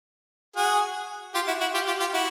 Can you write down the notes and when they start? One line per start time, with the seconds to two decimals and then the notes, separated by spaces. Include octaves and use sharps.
0.56 F#4 G#4
1.35 F4 G4
1.47 E4 F#4
1.61 E4 F#4
1.74 F4 G4
1.87 F4 G4
2.00 F4 G4
2.13 E4 F#4